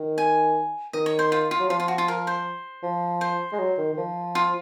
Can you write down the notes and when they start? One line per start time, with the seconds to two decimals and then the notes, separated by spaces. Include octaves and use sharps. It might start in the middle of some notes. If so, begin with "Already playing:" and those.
Already playing: D#3
0.18 G#5
0.93 D#3 D#5
1.06 C#5
1.19 C5
1.32 F4
1.51 F4
1.60 F#3
1.69 F3 F4
1.80 F4
1.88 F#4
1.98 F4
2.08 A#4
2.27 C5
2.83 F3
3.21 C5
3.53 G#3
3.59 F#3
3.78 D#3
3.93 D#3
3.97 F3
4.35 F4